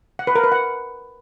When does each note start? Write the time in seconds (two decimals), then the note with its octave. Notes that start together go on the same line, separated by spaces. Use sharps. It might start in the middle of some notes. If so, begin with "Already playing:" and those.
0.19 F#5
0.27 B4
0.35 A#4
0.44 B4
0.52 F#5